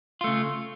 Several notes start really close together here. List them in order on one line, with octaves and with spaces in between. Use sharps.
F4 A3 C#3